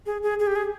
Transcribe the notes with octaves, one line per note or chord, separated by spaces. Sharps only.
G#4
G#4
G#4
G4
G#4